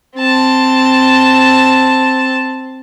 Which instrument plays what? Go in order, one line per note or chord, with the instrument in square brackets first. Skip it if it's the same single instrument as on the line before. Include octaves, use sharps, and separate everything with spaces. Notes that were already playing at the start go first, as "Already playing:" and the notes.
[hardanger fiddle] C4 A5